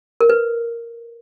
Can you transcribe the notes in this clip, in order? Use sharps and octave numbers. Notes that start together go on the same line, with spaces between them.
A#4
B4